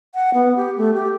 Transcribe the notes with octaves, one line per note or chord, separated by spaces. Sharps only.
F#5
B3
G4
A3
G4